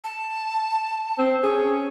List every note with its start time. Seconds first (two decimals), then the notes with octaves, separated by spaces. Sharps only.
0.04 A5
1.19 C4
1.43 C#4 G#4